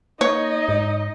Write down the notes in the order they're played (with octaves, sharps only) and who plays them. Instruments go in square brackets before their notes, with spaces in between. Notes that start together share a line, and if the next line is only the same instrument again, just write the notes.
[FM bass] A#3 [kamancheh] D#4 D#5 [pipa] C#5
[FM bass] G#2